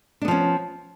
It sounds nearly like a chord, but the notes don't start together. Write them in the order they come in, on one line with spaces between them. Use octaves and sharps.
D4 B3 F3 C#4